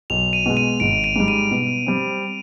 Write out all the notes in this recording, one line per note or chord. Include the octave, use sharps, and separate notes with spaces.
B1 F7
D#7
B2 G#3
D#7
G#1 D7
D#7
G#2 G3
D#7
B2
G3 C4